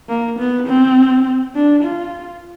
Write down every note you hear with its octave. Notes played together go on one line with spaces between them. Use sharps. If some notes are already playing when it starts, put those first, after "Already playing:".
A#3
B3
C4
D4
F4